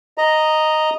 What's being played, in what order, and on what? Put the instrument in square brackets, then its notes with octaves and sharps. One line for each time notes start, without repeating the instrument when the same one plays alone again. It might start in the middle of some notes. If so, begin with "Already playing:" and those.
[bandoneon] D#5 A#5